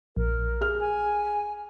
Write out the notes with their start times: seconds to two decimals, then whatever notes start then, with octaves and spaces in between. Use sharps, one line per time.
0.16 A#1 A#4
0.61 G#4 F6
0.80 G#5